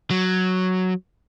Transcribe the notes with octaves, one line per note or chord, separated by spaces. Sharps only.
F#3